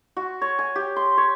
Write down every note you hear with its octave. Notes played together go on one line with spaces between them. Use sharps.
F#4
C#5
G#5
G4
C6
C#5